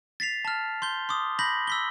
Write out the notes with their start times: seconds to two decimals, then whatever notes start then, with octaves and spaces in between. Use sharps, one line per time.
0.20 A6 B6 C7 F7
0.45 A5 F6
0.82 C6 G6 G7
1.09 C6 D6 D#6
1.39 B5 G6 A#6 B6 F#7
1.67 E6 B6 G7